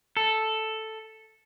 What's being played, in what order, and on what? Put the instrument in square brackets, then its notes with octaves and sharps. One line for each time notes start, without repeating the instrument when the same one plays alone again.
[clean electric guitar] A4